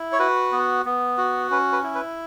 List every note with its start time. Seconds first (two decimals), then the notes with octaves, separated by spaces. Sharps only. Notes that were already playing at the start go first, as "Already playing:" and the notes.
Already playing: E4
0.12 C#5
0.19 F#4 B4
0.52 B3
0.85 B3
1.18 F#4
1.51 C#4 B4
1.72 B4
1.83 E4
1.95 B4